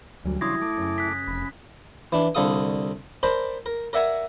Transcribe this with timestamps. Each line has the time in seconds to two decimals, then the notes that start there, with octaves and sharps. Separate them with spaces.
0.25 D2 E3 F#3 G3
0.41 C#3 D4 E4 C6 D#6 G#6 A#6
0.62 A3 D6
0.77 F#2 C#3
0.98 F#6 B6
1.27 F1 B5
2.12 E3 D4
2.35 C2 D3 A4 F5 D#6
3.23 A#4 C5 D5 A5 B5
3.66 A#4
3.93 A#4 D5 E5 F#5 G#5 A#5